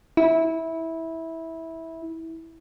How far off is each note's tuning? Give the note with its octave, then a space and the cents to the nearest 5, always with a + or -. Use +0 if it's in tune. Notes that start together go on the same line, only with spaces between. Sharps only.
E4 -15